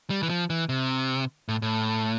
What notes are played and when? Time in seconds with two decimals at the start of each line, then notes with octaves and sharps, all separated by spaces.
0.10 G3
0.23 E3
0.30 F3
0.50 E3
0.69 C3
1.48 A2
1.62 A2